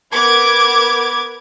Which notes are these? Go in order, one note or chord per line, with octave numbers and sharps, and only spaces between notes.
B3 A#4 D6 G#6